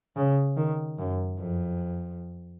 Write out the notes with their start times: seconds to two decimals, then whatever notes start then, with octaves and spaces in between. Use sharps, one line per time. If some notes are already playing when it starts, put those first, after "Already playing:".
0.16 C#3
0.57 D#3
0.98 F#2
1.39 F2